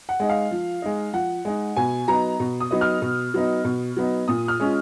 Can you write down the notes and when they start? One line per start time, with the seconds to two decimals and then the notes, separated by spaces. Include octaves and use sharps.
0.09 F#5
0.20 G#3 D#4
0.29 F5
0.51 F3
0.82 G#3 D#4
1.13 F3 F#5
1.45 G#3 D#4
1.76 B2 G#5
2.08 F#3 B3 D#4 A#5
2.40 B2
2.60 D#6
2.71 F#3 B3 D#4
2.81 F6
3.02 B2
3.34 F#3 B3 D#4
3.64 B2
3.97 F#3 B3 D#4
4.28 A#2 D#6
4.48 F6
4.60 G#3 C#4 F4